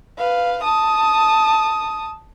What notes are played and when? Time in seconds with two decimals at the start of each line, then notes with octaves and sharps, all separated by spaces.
0.18 B4 F5
0.63 A5 D#6